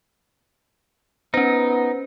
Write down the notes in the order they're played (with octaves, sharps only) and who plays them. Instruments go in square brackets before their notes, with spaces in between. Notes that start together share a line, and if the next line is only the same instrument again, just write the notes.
[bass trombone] B3 [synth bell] C#4 C5 [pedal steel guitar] D#4